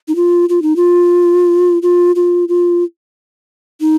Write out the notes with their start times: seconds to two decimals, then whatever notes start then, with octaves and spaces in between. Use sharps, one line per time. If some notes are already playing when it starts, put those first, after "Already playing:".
0.08 D#4
0.16 F4
0.49 F4
0.62 D#4
0.76 F4
1.82 F4
2.16 F4
2.49 F4
3.81 D#4